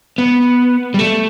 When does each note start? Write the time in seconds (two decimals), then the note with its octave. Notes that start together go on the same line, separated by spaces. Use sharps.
0.18 B3
0.94 G3
0.99 A3